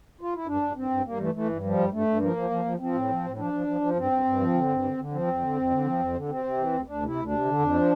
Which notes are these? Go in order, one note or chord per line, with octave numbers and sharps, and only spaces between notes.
F4
E4
G2 D4
G2
G2 C4
G2
G2 A#3
E3 A3
E3 A3
G2
F3 G3
G2
G2 A3
G2
F3 A#3
F3
F3
F3
F3 C4
A2
F3
A2
F3 D4
F3
F3
F3
G2 C4
G2
G2
F3
D3
G2
D3
D3
F3 C4
F2
D3
F2
D3
F3
F2
D3
C3 C4
C3
E3
D2
D2 D4
C3 E4
D2
D4
C3
D3
F2
F3